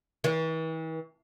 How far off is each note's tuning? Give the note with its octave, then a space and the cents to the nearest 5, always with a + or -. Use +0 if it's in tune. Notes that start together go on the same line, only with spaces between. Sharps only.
E3 -40